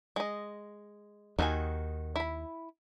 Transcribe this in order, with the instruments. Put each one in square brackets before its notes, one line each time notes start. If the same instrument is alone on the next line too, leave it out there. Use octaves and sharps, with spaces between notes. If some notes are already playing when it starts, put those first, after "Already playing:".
[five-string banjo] G#3 D#5
[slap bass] D#2 [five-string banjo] D#3 F#4 G#5
[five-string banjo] E4 B5